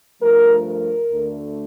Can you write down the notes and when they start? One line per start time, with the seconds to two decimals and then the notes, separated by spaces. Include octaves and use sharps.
0.21 G2 F3 A3 A#4
0.65 A#4
1.10 D2 D3 A3